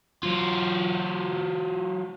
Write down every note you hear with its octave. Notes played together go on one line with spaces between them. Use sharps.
F#3 F4